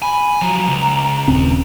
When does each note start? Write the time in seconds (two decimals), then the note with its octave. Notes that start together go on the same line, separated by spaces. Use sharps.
0.02 G#5 B5
0.41 F3 F#3 A#5
0.68 C#2
1.28 D#1 C4 C#4